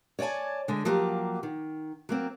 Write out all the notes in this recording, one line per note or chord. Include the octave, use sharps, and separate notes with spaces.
C#5 D5 F5 G#5 A5
D3 G#3
F3 F#3 A#3 G4
D#3
F#3 A#3 C4